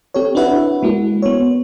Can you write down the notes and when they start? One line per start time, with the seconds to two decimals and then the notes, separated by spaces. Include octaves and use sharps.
0.14 C4 G4 A4 C#5
0.35 D4 E4 F#4 B4 E5 F#5
0.83 G#3 A#3 E4 F#4
1.22 B3 C#5